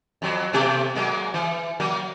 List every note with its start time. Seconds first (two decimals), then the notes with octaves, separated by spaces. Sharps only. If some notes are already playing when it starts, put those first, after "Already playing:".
0.22 F2 F#3
0.53 B2 A3 G4
0.95 F#3 G#3 A#3
1.34 E3
1.80 F#3 A#3 A#4